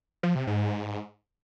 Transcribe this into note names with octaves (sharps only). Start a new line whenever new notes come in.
F3
C3
G#2